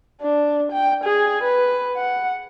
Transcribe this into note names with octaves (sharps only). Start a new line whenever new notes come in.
D4
G5
G#4
B4
F#5